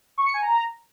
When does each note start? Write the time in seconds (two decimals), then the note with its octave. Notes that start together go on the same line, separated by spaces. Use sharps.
0.18 C#6
0.26 C#7
0.34 G#5
0.42 A#5